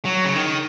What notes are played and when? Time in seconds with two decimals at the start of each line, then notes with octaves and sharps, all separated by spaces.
0.05 F#3
0.25 C#3
0.36 D#3